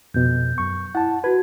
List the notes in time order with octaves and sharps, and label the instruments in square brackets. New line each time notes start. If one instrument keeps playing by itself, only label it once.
[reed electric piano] F2 B2 [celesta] G6
[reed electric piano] F#2 C#6
[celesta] E4 [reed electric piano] F#5 A5
[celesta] F#4 G#6 [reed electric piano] B4